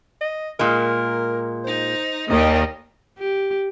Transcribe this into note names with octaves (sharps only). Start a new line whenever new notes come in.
D#5
A#2 G#3 A#4
D#4 C5
D#2 D#3 G3 D#5
G4